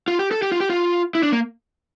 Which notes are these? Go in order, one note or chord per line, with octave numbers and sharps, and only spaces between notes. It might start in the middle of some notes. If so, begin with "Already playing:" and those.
F4
G4
A4
G4
F4
G4
F4
E4
D4
A#3